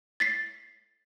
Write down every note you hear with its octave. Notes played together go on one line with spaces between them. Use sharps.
A6 B6 C7